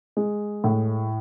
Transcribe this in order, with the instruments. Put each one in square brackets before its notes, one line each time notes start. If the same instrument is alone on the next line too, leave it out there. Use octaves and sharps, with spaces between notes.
[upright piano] G#3
A2